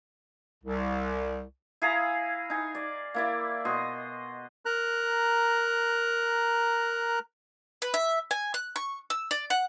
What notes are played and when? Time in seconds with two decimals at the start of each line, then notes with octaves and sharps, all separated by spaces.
0.64 C2
1.82 E4 G#4 F5 A#5
2.50 D#4 G#5
2.75 D5
3.14 A#3 E4 D5
3.65 B2 D#5 C6
4.66 A#4 A#5 F#6
7.82 B4
7.94 E5
8.31 G#5
8.54 F#6
8.76 C#6
9.10 E6
9.31 D5
9.50 F#5